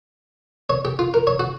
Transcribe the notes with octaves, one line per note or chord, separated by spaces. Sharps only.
C#5
G4
F4
A#4
C#5
F#4